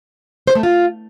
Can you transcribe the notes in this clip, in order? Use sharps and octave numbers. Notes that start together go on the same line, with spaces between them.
C5
A3
F4